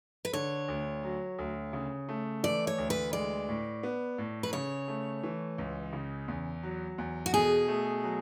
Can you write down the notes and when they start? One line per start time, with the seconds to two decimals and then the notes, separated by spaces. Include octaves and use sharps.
0.25 B4
0.33 D3 C#5
0.68 D2
1.03 F#3
1.38 D2
1.73 C#3
2.09 A3
2.43 E3 D5
2.67 C#5
2.78 D2
2.90 B4
3.13 G#3 D5
3.49 A2
3.83 B3
4.18 A2
4.43 B4
4.53 C#3 C#5
4.88 A3
5.23 E3
5.58 C#2
5.93 C#3
6.28 E2
6.63 F#3
6.98 E2
7.26 F#4
7.33 B2 G#4
7.68 A3
8.03 F#3